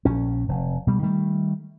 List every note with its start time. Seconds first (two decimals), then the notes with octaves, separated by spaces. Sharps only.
0.05 A#1 C#4
0.48 F1
0.87 B2 G3
1.02 D#3 G3 A3